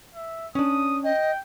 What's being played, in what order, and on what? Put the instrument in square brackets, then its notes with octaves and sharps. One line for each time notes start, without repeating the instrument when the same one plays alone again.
[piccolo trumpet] E5
[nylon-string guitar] C#4 D4 [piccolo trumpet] D#6
[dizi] D#5 [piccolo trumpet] G5